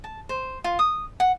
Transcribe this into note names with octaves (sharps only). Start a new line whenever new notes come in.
A5
C5
F4
D#6
F#5